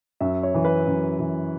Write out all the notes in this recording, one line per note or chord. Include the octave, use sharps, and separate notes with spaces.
F#2 E5
C#5
E3
B4
F#2
E3